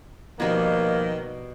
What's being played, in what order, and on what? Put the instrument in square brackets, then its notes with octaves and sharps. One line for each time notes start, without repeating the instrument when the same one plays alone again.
[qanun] B2 G3 G#5 [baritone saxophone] D#3 [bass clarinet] F3 [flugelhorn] A#3